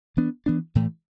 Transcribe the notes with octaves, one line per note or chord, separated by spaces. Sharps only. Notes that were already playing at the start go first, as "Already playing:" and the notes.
E3 B3 D4
E3 B3 D4
A2 E3 A3